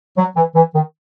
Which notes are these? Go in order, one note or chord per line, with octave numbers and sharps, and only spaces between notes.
F#3
E3
E3
D#3